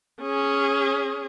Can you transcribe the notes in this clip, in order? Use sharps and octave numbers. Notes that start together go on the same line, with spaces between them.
C#4 G#4